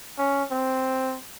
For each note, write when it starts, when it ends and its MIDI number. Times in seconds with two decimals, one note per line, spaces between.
0.18 0.43 61
0.51 1.18 60